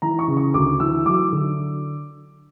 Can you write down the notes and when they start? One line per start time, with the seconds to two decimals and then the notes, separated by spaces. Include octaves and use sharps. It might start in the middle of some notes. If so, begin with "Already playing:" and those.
0.02 E3 A#5
0.19 C#6
0.28 C#3
0.37 C#6
0.54 D2 D6
0.80 E3 E6
1.06 F#3 D6
1.32 D3